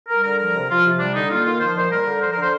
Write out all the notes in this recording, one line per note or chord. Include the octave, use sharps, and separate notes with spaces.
G3 A#4
D3 A#4
F3 A#4
C3
F3 F4
C3
G3 D4
D3 D#4
A#3 F4
D#3 F4
F3 C5
A#2 C5
G3 A#4
D3
F3 C5
D3 A#4
C5